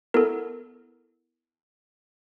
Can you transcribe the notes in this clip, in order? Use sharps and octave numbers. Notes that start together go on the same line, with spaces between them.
B3 E4 A4 A#4